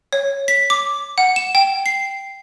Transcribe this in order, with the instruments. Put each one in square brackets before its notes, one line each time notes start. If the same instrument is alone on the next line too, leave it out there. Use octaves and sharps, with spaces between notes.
[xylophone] C#5
B6
D6
F#5
E7
G5
C7